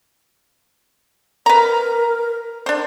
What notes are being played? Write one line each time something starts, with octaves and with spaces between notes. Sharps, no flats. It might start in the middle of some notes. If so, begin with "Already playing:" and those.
A#4 B4 A#5
D4 C5